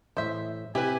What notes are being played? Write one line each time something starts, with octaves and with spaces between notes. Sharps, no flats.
A2 E3 C5 E5
C3 E4 G4 B4 G#5